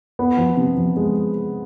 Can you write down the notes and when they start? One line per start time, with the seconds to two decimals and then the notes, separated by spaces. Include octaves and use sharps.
0.19 B3
0.37 F3
0.57 C3
0.76 F3
0.97 G#3